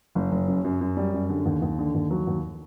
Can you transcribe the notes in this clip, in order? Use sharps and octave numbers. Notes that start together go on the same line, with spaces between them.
F#1
F#1
F#2
F#2
F#2
G3
F#2
D3
D#2
D#2
D3
D#2
F#3
D#2